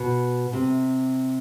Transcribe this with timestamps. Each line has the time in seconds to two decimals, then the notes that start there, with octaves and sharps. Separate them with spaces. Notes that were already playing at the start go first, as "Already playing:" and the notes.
Already playing: B2
0.53 C3